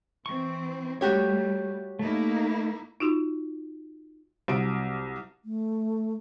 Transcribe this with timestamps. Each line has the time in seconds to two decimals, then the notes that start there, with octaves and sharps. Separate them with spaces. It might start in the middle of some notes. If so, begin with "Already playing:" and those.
0.26 E3 C4 C#6
1.01 G3 A3 F#4 G4 C#5
1.99 A3 A#3 D#4 E4
3.00 D#4 F4 F#4 C6
4.48 C2 C3 F#3 D7
5.45 A3